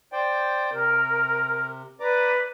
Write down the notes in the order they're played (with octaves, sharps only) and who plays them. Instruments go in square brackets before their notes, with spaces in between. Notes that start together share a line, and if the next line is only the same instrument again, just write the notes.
[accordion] C5 D5 G5
[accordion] C3 [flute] A#4
[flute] B4 [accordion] D5 A#5 D6